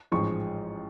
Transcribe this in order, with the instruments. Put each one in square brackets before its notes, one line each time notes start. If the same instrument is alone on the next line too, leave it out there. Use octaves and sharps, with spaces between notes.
[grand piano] A1 G#2 F3 G#3 C#6